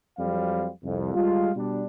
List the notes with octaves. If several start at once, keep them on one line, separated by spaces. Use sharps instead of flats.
F2 F#3 G3 C4 F5
C2 F2
G3 G#3 F4
B2 G3 D4